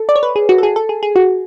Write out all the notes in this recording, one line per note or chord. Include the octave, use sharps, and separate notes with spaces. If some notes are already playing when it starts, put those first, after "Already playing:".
Already playing: A4
D5
C#5
B4
G#4
F#4
A4
G#4
A4
G#4
G#4
F#4